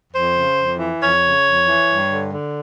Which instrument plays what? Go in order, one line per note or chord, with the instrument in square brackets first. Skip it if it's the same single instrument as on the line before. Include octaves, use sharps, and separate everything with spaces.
[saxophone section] F2 C5
C#3
F2
E3
F2 C#5
C#3
F2
E3
G2
D3
D3